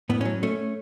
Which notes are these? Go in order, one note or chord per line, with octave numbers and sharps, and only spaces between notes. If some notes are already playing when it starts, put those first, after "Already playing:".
A2 B3
F#3 C#4
A3 C#4